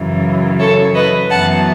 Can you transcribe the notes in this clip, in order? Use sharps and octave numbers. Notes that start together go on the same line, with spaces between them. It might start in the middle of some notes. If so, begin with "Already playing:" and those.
Already playing: F#2 C#3 E3
A4 C#5
B4 D#5
F#2 E3 B3 F#5 A5